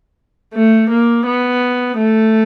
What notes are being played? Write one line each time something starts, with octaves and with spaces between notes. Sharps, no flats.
A3
A#3
B3
A3